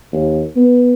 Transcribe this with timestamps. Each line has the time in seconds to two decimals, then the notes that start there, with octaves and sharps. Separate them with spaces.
0.13 D#2
0.56 B3